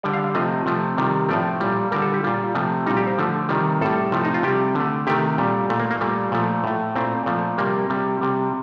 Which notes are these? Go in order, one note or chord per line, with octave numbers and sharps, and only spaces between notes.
D3 G3 D5
F5
F5
C3 F3 A3 D#5
C3 F3 A3
C3 D#3 G3
A2 F3 A3 D5
A#2 G3
D3 G3 A#4
A4
G4
A#2 G3 F4
C3 F3 A3
A#2 G3 D#4
G4
C5
D3 F3 A3
C3 D#3 G3
A2 G3 A4
C3 F3 A3
D#4
F4
C3 G3 G4
D3 A3
C3 D#3 A3 G4
A#2 G3
A#2 A3
A#3
A#3
A#2 G3 A3
A#2 F3 A3
A2 A3
A#2 A3 C4
A#2 F3 A3
C3 G3 A#3
C3 G3
C3 G3